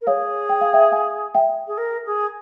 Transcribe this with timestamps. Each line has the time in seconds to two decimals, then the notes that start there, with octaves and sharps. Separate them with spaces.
0.01 A#4
0.07 G#4 C#5 F5
0.49 G5
0.61 F5
0.73 E5 G5
0.92 F5 G#5
1.35 E5 G5
1.67 G#4
1.77 A#4
2.05 G#4